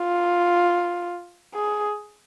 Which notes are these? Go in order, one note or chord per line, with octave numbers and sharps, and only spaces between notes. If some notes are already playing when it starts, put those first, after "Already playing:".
Already playing: F4
G#4